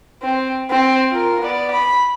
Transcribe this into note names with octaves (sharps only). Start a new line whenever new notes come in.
C4
C4
F4 A#4
B3 D5
B5